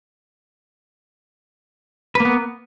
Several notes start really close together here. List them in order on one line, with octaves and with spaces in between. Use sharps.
B4 A#3 B3